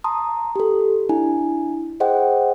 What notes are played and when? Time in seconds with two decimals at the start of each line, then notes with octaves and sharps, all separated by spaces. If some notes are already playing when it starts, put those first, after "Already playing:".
0.04 A5 A#5 C6 D#6
0.56 G4 A4
1.09 D4 E4 G#5
2.00 G#4 C5 D#5 F#5 G5